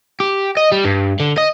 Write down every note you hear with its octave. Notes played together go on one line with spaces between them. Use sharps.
G4
D#5
G3
G2
D3
D#5